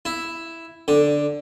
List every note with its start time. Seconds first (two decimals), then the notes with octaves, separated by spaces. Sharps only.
0.05 E4
0.88 D3